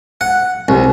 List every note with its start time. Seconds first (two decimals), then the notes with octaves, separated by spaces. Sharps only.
0.21 F#5
0.68 C2